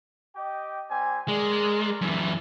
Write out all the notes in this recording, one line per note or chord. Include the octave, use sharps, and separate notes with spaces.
G4 D#5 G5
G3 C4 G#5
G#3 A#4 D5
F#2 E3